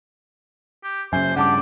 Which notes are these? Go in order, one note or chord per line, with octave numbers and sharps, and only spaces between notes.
G4
F#2 C#3 C5 E5 G#5
G2 C#3 G4 D5 F#5 A5 D6